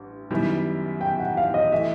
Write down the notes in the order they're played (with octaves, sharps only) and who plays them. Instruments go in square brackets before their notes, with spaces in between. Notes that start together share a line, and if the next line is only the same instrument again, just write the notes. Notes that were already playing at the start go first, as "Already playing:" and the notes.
Already playing: [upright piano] A1 G2
F#2 D#3 G3 B3 E4
[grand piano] G5
F#5
F5
D#5
[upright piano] E3 A3 [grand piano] E5